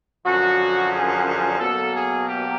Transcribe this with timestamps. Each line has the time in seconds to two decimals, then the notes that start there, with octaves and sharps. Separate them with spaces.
0.25 F#2 D3 F3 F#4
0.92 G#4
1.26 G#4
1.59 B2 F#3 A#3 A4
1.93 G#4
2.27 G4